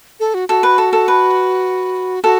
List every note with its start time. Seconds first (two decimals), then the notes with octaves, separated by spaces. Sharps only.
0.20 A4
0.34 F#4
0.49 F#4 A4
0.63 B4
0.78 A4
0.93 A4
1.08 B4
2.24 F#4 A4